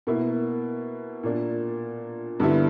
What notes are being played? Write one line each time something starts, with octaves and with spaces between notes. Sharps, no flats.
B2 A#3 E4
A#2 A#3 D4
G2 D3 G3 B3 E4